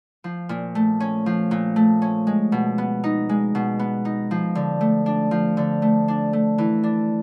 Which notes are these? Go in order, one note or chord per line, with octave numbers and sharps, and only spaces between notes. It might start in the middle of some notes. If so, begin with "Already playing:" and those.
F3
A#2
A3
C#4
F3
A#2
A3
C#4
G#3
B2
B3
D#4
G#3
B2
B3
D#4
F3
D3
A3
D4
F3
D3
A3
D4
A3
E3
D4